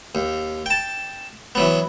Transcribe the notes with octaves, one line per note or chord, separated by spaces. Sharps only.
D#2
G5 A5
E3 F#3 B3